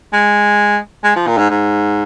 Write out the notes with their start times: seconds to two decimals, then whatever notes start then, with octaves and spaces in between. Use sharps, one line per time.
0.13 G#3
1.04 G#3
1.16 F3
1.27 A#2
1.38 G#2
1.50 G#2